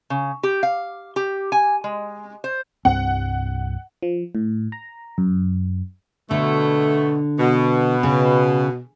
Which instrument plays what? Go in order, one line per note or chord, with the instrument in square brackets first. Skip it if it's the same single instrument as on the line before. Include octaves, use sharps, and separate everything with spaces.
[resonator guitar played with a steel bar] C#3
G4
F5
G4
G#5
G#3
C5
[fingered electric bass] C2 G2 C4 [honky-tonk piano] F#5
[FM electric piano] F3
A2
A#5
F#2
[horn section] B2 A3 [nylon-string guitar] D3
[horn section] B2
[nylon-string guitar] C#3